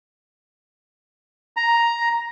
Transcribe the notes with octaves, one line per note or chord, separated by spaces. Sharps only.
A#5